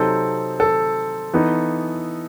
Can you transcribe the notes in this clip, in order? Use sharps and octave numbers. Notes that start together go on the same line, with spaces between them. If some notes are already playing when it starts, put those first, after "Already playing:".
Already playing: C3 F#3 C4 D#4 A4
A4
E3 B3 D#4